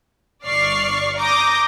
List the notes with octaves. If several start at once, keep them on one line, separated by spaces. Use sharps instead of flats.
G1 D5 C#6 F6 C7
A#5 D6 D#6 G6 A#6